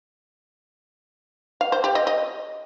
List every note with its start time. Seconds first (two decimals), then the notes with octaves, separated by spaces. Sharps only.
1.61 F5
1.72 C5
1.84 G4
1.95 D#5
2.07 D#5